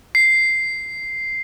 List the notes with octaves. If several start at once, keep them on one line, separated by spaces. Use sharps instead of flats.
C7